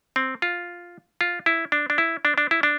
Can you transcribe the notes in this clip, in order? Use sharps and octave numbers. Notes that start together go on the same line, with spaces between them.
C4
F4
F4
E4
D4
D4
E4
D4
D4
E4
D4